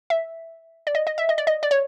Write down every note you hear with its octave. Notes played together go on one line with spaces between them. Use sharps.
E5
D5
D#5
D#5
E5
D#5
D5
D#5
D5
C#5